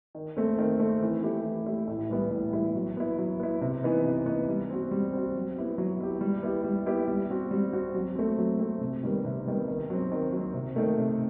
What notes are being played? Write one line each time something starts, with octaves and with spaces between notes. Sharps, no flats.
D#3
A3 C4
D#3
A3 C4
E3
A3 E4 G4
E3
A3 E4 G4
A2
E3 G3 B3 E4
A2
E3 G3 B3 E4
F#3
B3 E4
F#3
B3 E4
C3
E3 B3 D#4
C3
E3 B3 D#4
G3
C4 F#4
G3
C4 F#4
F#3
B3 E4 G4
F#3
B3 E4 G4
G3
B3 E4 G4
G3
B3 E4 G4
G3
C4 F#4
G3
C4 F#4
F#3
A3 C4
F#3
A3 C4
C3
D#3 G3 B3
C3
D#3 G3 B3
D#3
F#3 C4
D#3
F#3 C4
C3
D#3 A3
C3